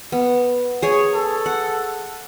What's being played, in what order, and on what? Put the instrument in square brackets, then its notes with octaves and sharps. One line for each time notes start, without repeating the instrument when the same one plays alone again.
[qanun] B3
G#4 C#5
[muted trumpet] A4
[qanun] F#5